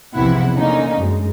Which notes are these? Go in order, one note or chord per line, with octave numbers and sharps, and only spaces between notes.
B1 E2 C3 F3 E4 F#5
D3 A#3 C#4 D#4
F#2 G#3